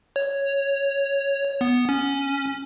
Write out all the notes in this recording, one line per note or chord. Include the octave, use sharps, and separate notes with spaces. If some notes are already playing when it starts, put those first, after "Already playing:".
C#5
B3
C#4